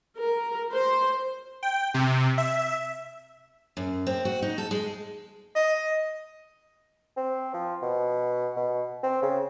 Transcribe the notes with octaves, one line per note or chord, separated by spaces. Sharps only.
A#4
C5
G5
C3
E5
F#2
C4
F#4
D#4
A4
G#3
D#5
C4
F3
B2
B2
C4
C#3